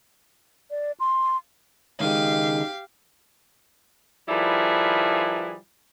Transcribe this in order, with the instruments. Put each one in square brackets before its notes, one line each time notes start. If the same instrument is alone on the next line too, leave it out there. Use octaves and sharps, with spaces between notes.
[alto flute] D5
C6
[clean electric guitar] C#2 D#3 G#3 [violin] G4 F5
[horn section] D#3 F3 G3 E4 G#4 B4